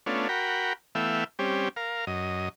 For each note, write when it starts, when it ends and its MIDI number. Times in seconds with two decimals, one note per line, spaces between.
0.06 0.28 57
0.06 0.28 59
0.06 0.28 61
0.06 0.28 62
0.06 0.28 65
0.29 0.73 66
0.29 0.73 70
0.29 0.73 79
0.29 0.73 83
0.95 1.24 52
0.95 1.24 57
0.95 1.24 59
0.95 1.24 76
0.95 1.24 77
0.95 1.24 79
1.39 1.69 55
1.39 1.69 60
1.39 1.69 61
1.39 1.69 67
1.76 2.05 70
1.76 2.05 77
2.07 2.49 42
2.07 2.49 75